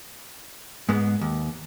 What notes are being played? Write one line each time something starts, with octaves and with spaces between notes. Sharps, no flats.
G#2 G#3 B3
D#2